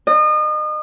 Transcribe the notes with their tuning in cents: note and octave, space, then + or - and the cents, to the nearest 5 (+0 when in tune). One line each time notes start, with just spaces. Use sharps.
D#5 -35